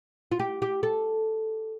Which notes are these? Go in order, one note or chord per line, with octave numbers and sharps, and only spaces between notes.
F4
G4
G4
A4